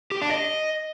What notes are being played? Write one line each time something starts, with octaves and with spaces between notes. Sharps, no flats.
G4
D4
D#5